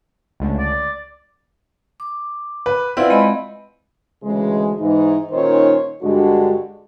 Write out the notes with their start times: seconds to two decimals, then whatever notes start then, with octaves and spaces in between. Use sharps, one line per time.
0.40 C#2 D3 A3
0.59 D5
2.00 D6
2.66 B4
2.97 C4 E4 F4 B4 D5 F#5
3.10 G#3 D#5 B5
4.23 D2 C#3 E3 G#3
4.80 G#2 E3 D#4
5.31 A#2 D#3 C#4 D#4 C5 C#5
6.02 G2 D3 G#3 D4 F#4 G4